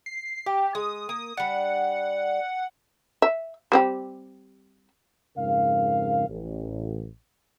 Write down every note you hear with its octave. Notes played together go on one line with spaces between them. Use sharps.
C7
G4 G5
G#3 D#6
A#3 D#6
G3 D4 F#5
E5
G3 C4 G4
F2 G#2 C#3 A#4 F5
A1